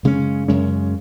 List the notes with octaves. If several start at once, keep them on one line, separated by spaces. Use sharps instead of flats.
F#2 C#3 G#3 C#4
F#2 C#3 G#3 C#4